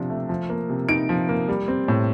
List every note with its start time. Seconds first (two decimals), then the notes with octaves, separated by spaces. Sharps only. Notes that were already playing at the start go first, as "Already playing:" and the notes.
Already playing: C3 F3 D4
0.10 A3
0.29 F3
0.49 A#3
0.69 C3
0.89 D#4 D7
1.09 F3
1.29 A#3
1.49 G3
1.68 C4
1.88 A2